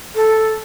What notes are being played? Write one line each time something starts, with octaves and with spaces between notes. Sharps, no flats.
A4